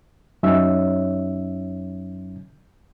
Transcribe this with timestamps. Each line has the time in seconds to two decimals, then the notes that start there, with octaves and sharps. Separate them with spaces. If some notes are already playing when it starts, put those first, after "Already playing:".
0.43 F#2 F#3 C#4 D#4 C#5 E5